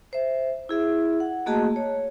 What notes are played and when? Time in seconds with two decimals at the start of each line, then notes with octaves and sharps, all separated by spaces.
0.13 C5 E5
0.69 E4 G#4 E5
1.20 F#5
1.46 A3 A#3 F#4 G#4 D#5 A5
1.76 C#5